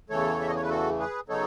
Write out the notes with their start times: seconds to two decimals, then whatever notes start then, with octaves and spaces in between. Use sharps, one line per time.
0.09 E2 C#3 E3 A3 A4 C#5
0.40 E5
0.48 D#5
0.55 C#5
0.62 B4
0.69 F#4 A4
0.99 G#4 B4
1.29 C#3 F#3 B3 D#4 A4 C#5